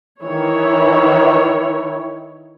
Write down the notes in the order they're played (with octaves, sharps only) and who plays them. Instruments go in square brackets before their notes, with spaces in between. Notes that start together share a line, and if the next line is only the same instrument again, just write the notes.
[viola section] D#3 E3 E4 C#5